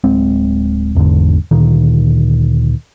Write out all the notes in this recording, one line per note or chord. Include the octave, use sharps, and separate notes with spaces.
D1 G#3 C4
G#1 E2 G#2 D3
D2 A#2 D#3